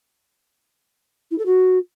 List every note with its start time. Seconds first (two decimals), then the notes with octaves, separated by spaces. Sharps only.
1.31 E4
1.38 A4
1.46 F#4